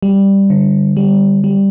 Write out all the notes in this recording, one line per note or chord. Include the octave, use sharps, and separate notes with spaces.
G3
D3
G3
G3